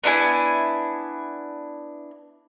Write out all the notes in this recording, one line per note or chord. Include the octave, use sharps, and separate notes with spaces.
B3 D4 E4 G#5